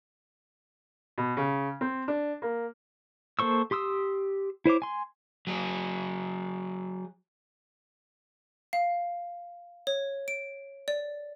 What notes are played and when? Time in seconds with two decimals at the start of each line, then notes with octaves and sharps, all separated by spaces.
1.18 B2
1.37 C#3
1.81 C4
2.08 D4
2.42 A#3
3.39 A#3 A4 C5 C#6 E6
3.71 G4 C6 D#6 E6
4.66 E4 C5 C#5 D6
4.82 G#5 C6
5.47 F#3 G#4
8.73 F5
9.87 C#5
10.28 D7
10.88 D5